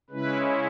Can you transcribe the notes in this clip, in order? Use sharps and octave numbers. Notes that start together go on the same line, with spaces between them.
C#3 G#3 C#4 E4 B4